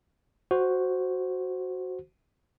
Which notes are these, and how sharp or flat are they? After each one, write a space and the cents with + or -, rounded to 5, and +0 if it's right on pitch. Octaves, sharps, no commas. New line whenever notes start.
F#4 +0 C5 +0